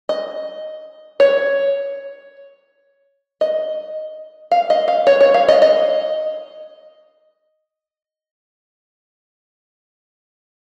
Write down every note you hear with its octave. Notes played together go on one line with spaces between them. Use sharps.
D#5
C#5
D#5
F5
D#5
F5
C#5
C#5
F5
D#5
D#5